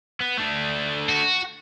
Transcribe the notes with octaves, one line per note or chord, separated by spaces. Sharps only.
B3
A3 D4
F#4